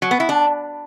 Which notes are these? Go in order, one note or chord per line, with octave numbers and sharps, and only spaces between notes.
F#3
B3
E4
D4